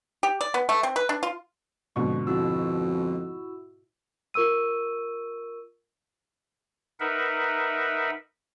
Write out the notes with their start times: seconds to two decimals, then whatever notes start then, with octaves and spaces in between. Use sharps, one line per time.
0.23 G4
0.41 D5
0.54 B3
0.69 A3
0.83 C4
0.96 B4
1.09 D4
1.23 F4
1.96 F2 G#2 B2 D3 C#6
2.27 F2 E4 F#4 E6
4.34 F4 A#4 C#6 E6 D#7
7.00 D#4 A#4 B4 E5 F#5